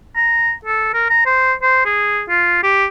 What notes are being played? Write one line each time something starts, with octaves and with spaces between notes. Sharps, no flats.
A#5
A4
A#4
A#5
C5
C5
G#4
F4
G4